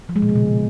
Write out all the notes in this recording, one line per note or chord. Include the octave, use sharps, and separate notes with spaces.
F3
G#3
A#2
B2
C#3